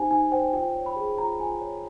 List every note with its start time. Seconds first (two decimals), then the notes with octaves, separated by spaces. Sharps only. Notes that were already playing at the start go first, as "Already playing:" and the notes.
Already playing: D#4 G4 C5 G#5
0.10 D#4 G#5
0.32 C5 G5
0.53 F4 G5
0.75 C#5
0.86 B5
0.96 G#4
1.18 F4 A#5
1.40 F4 G#5
1.61 C#5